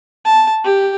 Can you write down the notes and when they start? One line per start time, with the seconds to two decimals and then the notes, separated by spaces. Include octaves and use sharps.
0.25 A5
0.64 G4